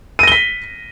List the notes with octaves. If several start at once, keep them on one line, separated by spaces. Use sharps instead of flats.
A#6 B6 D#7 G7